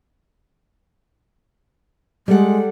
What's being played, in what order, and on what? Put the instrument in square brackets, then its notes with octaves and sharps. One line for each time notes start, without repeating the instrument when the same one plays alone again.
[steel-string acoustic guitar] G3 A4 F#5 [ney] G#3